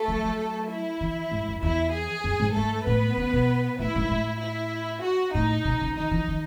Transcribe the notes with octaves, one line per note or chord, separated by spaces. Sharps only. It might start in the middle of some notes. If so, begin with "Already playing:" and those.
Already playing: A3 A4
F#3
F#3
E4
E3
G#2
F#2
E2 E4
G#4
F#2
G#2
G#2 A3 A4
A2 B3 B4
C#3
B2
A2 E4
G#2
A2
E4
F#4
A2 D#4
B2
C#3
D#3 D#4
E3
D#3